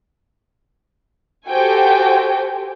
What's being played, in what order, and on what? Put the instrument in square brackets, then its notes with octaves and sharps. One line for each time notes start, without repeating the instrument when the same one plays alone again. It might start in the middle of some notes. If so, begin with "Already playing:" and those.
[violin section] F#4 G4 A4 C5 G5 G#5